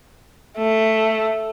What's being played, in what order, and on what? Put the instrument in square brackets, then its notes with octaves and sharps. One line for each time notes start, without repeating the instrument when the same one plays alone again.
[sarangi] A3